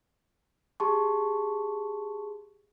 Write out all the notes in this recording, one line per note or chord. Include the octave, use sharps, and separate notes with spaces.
G4 G#4 A5 C6 C#6